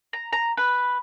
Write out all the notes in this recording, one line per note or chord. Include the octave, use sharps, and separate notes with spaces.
A#5
A#5
B4